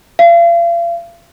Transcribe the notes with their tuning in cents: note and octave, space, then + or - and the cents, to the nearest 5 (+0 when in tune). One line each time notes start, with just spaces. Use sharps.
F5 -40